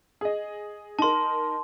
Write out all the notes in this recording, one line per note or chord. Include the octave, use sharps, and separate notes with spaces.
G#4 D#5
D#4 A#4 A5 C6